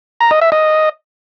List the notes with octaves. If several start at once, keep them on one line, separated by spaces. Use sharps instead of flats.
A#5
D#5
E5
D#5